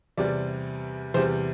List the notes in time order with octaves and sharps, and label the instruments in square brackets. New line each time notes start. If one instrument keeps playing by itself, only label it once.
[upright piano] E2 C3 G3 D5
E2 C3 G3 C5